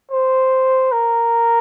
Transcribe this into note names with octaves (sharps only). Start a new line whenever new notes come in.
C5
A#4